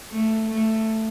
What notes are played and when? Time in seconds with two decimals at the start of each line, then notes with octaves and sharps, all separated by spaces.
0.09 A3
0.49 A3